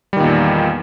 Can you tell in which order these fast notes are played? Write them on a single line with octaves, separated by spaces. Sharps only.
G3 D#3 A#2 E2